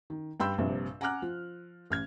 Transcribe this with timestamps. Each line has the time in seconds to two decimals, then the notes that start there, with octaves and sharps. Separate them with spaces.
0.10 D#3
0.40 G2 G5 B5 C6 E6 G6
0.58 A#1 G2 C3
1.01 F#5 G#5 A#5 D6 F6 F#6
1.22 F3
1.90 A1 F6 G#6